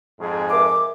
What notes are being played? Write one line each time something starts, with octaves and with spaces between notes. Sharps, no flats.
F2 G#2 G#4
A#4 E5 G#5 D6